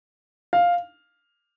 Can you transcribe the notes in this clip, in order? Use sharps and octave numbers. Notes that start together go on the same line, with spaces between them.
F5